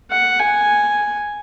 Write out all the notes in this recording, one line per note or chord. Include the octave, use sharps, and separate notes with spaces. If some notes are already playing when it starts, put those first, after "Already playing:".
F#5
G#5